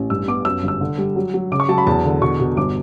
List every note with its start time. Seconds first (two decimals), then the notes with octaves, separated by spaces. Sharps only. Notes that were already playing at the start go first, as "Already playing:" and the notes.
Already playing: A1
0.10 G2 E6
0.28 B3 D6
0.45 F#2 E6
0.63 G1
0.68 E6
0.81 D3
0.98 G3
1.16 F#3
1.34 F#3
1.52 C#3 D6
1.60 C#6
1.69 F#3 A5
1.78 B5
1.87 E2 A5
2.05 D3
2.21 B2 C#6
2.40 B2
2.57 G1 D6